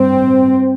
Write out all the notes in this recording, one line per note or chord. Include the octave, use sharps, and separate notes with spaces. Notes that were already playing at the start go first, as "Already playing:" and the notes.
Already playing: G2 C4